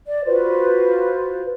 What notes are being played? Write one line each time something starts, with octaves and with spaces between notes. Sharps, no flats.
D5
F4 F#4 B4 C5